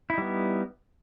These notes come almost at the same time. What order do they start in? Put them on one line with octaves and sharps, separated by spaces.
E4 D#4 G3 B3